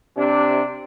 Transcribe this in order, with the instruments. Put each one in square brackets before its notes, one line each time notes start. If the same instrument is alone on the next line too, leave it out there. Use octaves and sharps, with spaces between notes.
[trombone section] C3 D4